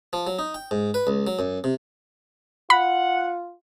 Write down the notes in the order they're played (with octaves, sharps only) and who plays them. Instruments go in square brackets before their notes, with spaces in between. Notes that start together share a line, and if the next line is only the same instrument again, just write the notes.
[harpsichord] F3
F#3
D#4
G5
G#2
B4
C#2
F#3
F#2
C3
[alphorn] F4 [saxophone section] F#5 [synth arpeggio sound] B5